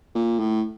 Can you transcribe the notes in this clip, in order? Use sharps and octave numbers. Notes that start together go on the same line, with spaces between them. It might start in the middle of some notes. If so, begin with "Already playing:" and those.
A#2
A2